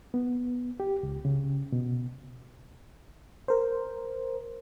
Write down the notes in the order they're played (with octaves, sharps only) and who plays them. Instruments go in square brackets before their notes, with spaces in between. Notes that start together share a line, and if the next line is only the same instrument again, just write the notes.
[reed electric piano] B3
G4
C#2
C#3
B2
[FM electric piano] A#4 C5